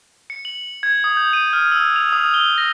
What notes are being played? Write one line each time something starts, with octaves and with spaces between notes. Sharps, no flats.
C#7
F#7
G#6
D#6
G6
D#7
F6
E6
F7
D#6
G7
A#6